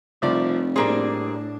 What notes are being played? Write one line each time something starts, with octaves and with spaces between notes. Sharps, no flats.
F1 C2 F3 D5
A2 G3 A#3 C4 D4 G#4